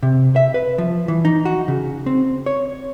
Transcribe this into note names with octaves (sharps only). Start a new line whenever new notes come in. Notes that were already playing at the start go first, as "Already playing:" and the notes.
C3
E5
B4
F3
E3
D#4
F#4
C#3
C4
C#5